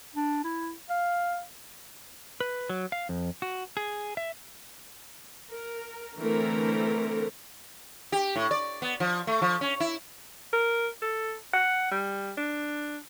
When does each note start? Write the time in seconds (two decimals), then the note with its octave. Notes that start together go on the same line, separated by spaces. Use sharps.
0.16 D4
0.44 E4
0.90 F5
2.40 B4
2.69 F#3
2.92 F5
3.09 F2
3.42 F#4
3.77 G#4
4.17 E5
5.51 A#4
6.17 D3 E3 A3 C4 A#4
8.12 G4
8.36 A2
8.51 D5
8.82 B3
9.00 F3
9.27 A3
9.42 F3
9.61 C#4
9.80 E4
10.53 A#4
11.02 A4
11.54 F#5
11.91 G3
12.37 D4